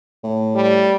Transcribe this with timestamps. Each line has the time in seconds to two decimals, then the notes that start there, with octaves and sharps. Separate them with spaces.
0.24 A2
0.55 G3